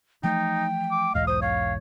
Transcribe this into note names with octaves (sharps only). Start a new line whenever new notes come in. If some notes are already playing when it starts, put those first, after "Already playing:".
E3 F3 A3 D#4 G5
D6
B1 E2 G#2 D#5 F5
C5 D#6
C#5 F5